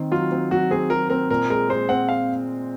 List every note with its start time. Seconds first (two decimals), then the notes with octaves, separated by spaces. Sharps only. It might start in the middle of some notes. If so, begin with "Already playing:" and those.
Already playing: D#3 C4
0.12 F#3 F4
0.32 C4
0.51 F#3 F#4
0.71 C4 G#4
0.90 F#3 A#4
1.10 C4 A#4
1.30 A#2 A#4
1.50 G#3 A#4
1.69 G#3 C5
1.89 C4 F#5
2.09 F5